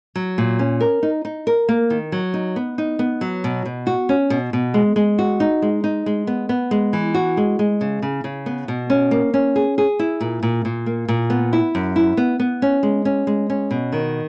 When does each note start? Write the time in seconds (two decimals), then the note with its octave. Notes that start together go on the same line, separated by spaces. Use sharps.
0.15 F#3
0.38 A#2
0.59 C#4
0.81 A#4
1.03 D#4
1.25 D#4
1.47 A#4
1.69 A#3
1.90 D#3
2.12 F#3
2.34 D#4
2.56 B3
2.78 D#4
2.99 B3
3.21 F#3
3.44 B2
3.65 B2
3.87 F#4
4.09 C#4
4.30 B2
4.53 B2
4.74 G#3
4.96 G#3
5.19 F#4
5.40 D#4
5.62 G#3
5.84 D#4
6.06 G#3
6.27 B3
6.49 B3
6.71 G#3
6.93 E3
7.14 F#4
7.37 G#3
7.59 G#3
7.81 C#3
8.02 C#3
8.24 C#3
8.46 B3
8.68 B2
8.90 C#4
9.11 A#3
9.34 C#4
9.56 G#4
9.78 G#4
9.99 E4
10.21 A#2
10.43 A#2
10.65 A#2
10.86 A#3
11.08 A#2
11.30 B3
11.53 E4
11.75 F#2
11.96 E4
12.17 B3
12.39 B3
12.62 C#4
12.83 G#3
13.05 C#4
13.27 G#3
13.50 C#4
13.71 B2
13.92 D#3